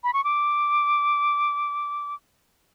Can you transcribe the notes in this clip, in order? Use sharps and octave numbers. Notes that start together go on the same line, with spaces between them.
B5
C#6
D6